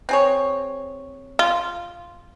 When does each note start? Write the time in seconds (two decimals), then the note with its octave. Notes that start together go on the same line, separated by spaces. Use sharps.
0.09 C4 G#4 C#5
1.39 F4